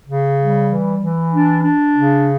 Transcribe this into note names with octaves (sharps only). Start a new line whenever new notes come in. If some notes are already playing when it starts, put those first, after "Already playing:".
C#3
G3
E3
E3
D4
D4
C#3